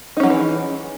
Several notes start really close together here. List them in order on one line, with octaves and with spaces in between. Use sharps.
D#4 C#4 F#3 G#4 E3